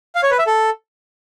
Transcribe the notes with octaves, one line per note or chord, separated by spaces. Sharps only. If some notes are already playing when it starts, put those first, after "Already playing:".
F5
C#5
B4
E5
A4